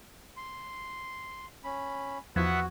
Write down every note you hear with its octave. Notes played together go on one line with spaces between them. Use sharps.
C6
C#4 B5
E2 F3 B3 F#4 E5 F#5 G#6